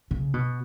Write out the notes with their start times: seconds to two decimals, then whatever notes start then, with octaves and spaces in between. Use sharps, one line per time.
0.11 C#3
0.34 B2